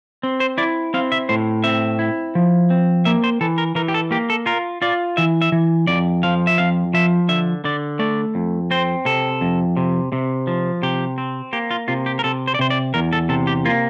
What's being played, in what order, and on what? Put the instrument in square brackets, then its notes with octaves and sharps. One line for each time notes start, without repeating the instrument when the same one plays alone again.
[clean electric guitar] C4
C5
E4 D5
C4 F5
E5
A2 C5
C4 E5
E4
F3
C4
A#3 E5
C5
E3 A4
A#4
E3 A#4
G4
A4
A#3 G4
A4
F4 A#4
F4 D5
E3 E5
E5
E3
F2 D5
F3 F5
E5
F2 F5
F3 E5
D3 E5
D3 D5
A3 D5
F2
C4 C5
C3 A4
F2
C3
C3
F3
C3 G4
C4
A#3 G4
F4
C3 F4
G4
A#4
C3 A4
C5
D5
C3 C5
D5
E2 A#4
A4
C3 A4
G4
A#3 F4